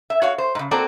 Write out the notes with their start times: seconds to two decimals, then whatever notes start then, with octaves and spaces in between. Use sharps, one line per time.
0.10 E5
0.22 F#4 C#5 F5
0.38 C5
0.55 G#2 C#3
0.71 A#3 C4 F#4 A4 D5